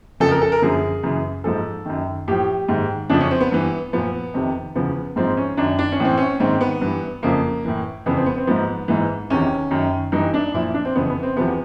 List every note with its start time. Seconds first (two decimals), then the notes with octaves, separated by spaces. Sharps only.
0.20 F2 C#3 F3 A4
0.31 A#4
0.42 A4
0.52 A#4
0.62 F#2 D3 F3 G#4
1.03 F#2 C#3 E3
1.44 G#2 F3 A4
1.85 F#2 D#3
2.28 A2 F3 G4
2.68 G#2 D#3
3.10 F2 C#3 F3 D4
3.21 C#4
3.31 C4
3.41 B3
3.52 G2 E3
3.93 A#2 F3 B3
4.34 F2 C3 D#3
4.75 E2 C#3 F3 B3
5.16 G#2 F3 C4
5.37 C#4
5.57 F#2 D#3 D4
5.79 D4
5.92 C#4
6.00 A2 E3 C4
6.17 C#4
6.40 G#2 D#3 C4
6.61 B3
6.81 G2 E3
7.23 F2 C#3 F3 A#3
7.65 A2 E3
8.06 F2 C#3 E3 B3
8.17 C4
8.26 B3
8.38 C4
8.47 G#2 F3 B3
8.88 G#2 E3
9.30 E2 C3 D#3 C#4
9.71 F#2 D#3
10.12 G2 E3 D#4
10.34 D4
10.54 A#2 F3 E4
10.74 D4
10.85 C4
10.95 F2 C#3 E3 B3
11.10 B3
11.23 C4
11.36 E2 C3 F3 B3